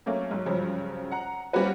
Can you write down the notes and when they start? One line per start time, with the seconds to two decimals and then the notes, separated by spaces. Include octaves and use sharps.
0.06 F#3 A3 A#3 C#4
0.31 G#2 F#3
0.46 G2 C#3 F3 F#3
1.11 F#5 A#5
1.53 G3 A#3 C4 C#4 F#4 B4